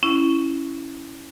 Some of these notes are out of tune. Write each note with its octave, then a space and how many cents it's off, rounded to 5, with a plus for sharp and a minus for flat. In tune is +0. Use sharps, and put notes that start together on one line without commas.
C#4 +0 E4 +0